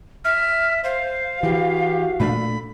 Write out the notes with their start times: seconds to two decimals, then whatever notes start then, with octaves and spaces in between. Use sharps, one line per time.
0.25 E5 F6
0.84 C5 F5
1.43 E3 F#4 G4
2.20 A#2 A3 D4 B5